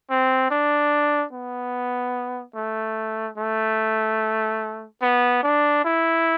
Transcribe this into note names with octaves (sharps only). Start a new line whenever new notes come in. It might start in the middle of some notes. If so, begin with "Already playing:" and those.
C4
D4
B3
A3
A3
B3
D4
E4